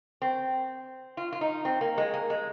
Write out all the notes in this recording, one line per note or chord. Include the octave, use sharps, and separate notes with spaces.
C4
F4
F4
D#4
C4
A#3
G#3
A#3
G#3